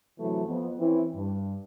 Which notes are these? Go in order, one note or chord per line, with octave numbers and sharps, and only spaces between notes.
C3 E3 F#3 A3
F2 B3
E3 C4 C#4 E4
G2